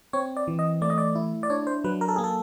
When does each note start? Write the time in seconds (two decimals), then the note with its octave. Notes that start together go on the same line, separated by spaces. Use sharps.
0.13 C4 C#5
0.37 D5
0.48 E3
0.59 D#5
0.81 A3 D5
0.90 D#5
0.98 D5
1.15 E4
1.43 D5
1.50 D4 C#5
1.67 C5
1.84 F#3 B4
2.01 A#4
2.08 A4
2.16 A#3 G#4
2.24 A4